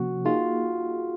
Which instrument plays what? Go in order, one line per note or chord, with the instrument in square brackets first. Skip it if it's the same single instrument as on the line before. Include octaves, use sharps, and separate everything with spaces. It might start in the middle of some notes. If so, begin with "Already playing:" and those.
Already playing: [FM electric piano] C3 F3 A#3 C#4 [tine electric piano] F#4
[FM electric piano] A#3 D#4 G#4 [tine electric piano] F4